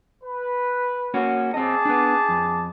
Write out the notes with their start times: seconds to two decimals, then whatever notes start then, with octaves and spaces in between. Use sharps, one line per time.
0.24 B4
1.14 A#3 C#4 F#4
1.54 C4 G#4 D#5 A5 D6
1.85 B3 D4
2.29 F2